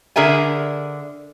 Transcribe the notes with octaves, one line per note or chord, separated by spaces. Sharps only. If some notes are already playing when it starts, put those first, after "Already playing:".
D3 G#4 A#4 E5 G#5